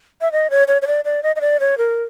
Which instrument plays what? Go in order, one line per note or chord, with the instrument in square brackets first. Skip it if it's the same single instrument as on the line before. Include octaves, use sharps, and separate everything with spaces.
[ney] E5
D#5
C#5
C#5
C#5
D5
D5
D#5
D#5
D5
C#5
A#4